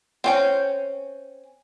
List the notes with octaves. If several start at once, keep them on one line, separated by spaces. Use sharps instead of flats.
C4 C#4 G5